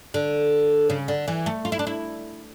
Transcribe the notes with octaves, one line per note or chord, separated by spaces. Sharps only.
D3
C#3
D3
E3
A3
F4
E4
D4
E4